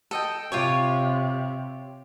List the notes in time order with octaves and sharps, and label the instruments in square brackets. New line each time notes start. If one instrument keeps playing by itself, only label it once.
[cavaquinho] A4 D#5 G5
[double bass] C3 [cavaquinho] F4 G4 C#5